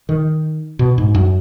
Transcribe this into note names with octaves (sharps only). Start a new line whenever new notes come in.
D#3
B2
G#2
F#2